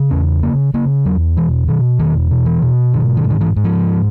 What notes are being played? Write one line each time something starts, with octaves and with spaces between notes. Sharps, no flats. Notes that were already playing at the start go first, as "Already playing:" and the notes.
Already playing: C#3
E2 C#4
C#3 A#3
C#3 A#3
E2 F#3
B2 E3
B2 D#3
E2 D#3
B2
E3
B2
G#2 D#3
D#3
G#2
D#3
E3
G#2
F3